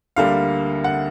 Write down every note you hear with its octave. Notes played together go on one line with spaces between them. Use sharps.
D2 D3 G3 A#3 F5
F#5